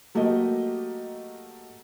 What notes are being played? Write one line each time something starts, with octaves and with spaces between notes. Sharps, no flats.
F#3 A3 A#3 G4 D#5